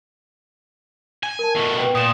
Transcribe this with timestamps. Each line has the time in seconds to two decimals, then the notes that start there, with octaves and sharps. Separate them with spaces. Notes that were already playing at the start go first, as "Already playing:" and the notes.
1.23 G#5
1.39 A#4 A5
1.56 B2 A3
1.78 B4 G5
1.95 A#2 D#6 E7